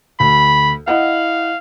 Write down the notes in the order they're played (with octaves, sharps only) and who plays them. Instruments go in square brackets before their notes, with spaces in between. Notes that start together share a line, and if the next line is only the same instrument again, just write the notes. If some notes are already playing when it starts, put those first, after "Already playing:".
[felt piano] D2 [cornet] B5
[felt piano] E4 D#5 F#5 [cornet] F5